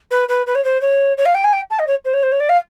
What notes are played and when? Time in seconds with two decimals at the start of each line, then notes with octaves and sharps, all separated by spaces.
0.11 B4
0.29 B4
0.47 B4
0.55 C#5
0.64 C5
0.81 C#5
1.17 C#5
1.25 F5
1.34 G5
1.44 G#5
1.53 G5
1.70 A5
1.79 D#5
1.87 C#5
2.05 C5
2.13 C#5
2.23 C5
2.32 C#5
2.40 D5
2.49 F5